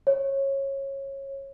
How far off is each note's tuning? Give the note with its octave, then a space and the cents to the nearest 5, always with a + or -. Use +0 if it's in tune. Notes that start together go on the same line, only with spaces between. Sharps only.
C#5 -20